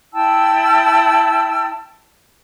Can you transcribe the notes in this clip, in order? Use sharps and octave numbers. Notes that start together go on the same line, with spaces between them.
E4 G5 A5 E6